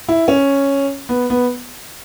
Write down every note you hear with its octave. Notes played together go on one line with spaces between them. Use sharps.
E4
C#4
B3
B3